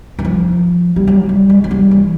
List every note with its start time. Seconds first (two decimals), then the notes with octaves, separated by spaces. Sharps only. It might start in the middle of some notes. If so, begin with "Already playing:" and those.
0.19 E3
0.25 F3
0.96 G3
1.07 F#3
1.29 G3
1.49 G#3
1.64 F#3
1.71 G3
1.91 E3